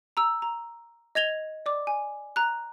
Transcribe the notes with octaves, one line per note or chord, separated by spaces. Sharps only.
A#5 E6
A#5
D#5 G#6 F7 G7
D5 D6
G#5
A#5 F#6